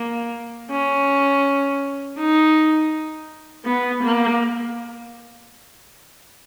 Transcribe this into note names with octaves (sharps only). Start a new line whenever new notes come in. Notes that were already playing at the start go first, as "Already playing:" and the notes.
Already playing: A#3
C#4
D#4
B3
A#3